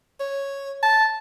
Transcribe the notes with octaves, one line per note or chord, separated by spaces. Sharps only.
C#5
A5